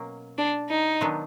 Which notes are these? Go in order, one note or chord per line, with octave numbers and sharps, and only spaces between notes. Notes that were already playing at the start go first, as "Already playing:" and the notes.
Already playing: B2 F#3 A#3 C#4
D4
D#4
D#3 F#3 B3 D4 F4